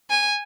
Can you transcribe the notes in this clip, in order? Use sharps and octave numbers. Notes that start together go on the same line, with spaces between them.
G#5